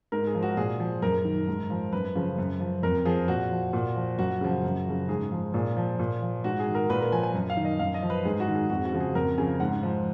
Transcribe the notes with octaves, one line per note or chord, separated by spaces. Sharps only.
G#2 A#4
G#4
F3
F#4
A#2 G#4
F3
F#2 A#4
D#3
G#2
F3
F#2 B4
C#3 F3
F#2
F3
F2 A#4
F3 G#4
A#2 F#4
F3
A#2
F3
F#2 F#4
C#3 F3
F#2
C#3 F3
G#2 G#4
F3
A#2 G#4
F3
A#2
F3
G#2 F#4
G#4
D#3
A#4
A#2 B4
A#4
F3 G#5
G#5
F#2
F5
D#3
D#5
F#2 F5
D#5
F3
B4
G#2 G#4
F#4
D#3
G#4
F2 F#4
F#4
C#3 F3
G#4
F2 A#4
C#3 F3 G#5
G#2 F#5
F3